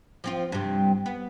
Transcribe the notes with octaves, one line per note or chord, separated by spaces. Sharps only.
F3 C4 F4
G2 C3
B3